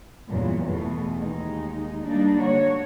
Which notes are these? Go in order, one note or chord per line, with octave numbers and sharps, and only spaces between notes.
E2 G2 A#2 F#3
E2 B2 E3 A3
D#2 G#3 D#4
G3 A#3 D4 D#4
D3 F#4 C#5